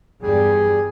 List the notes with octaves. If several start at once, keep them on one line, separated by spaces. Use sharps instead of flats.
E2 G2 G3 G#4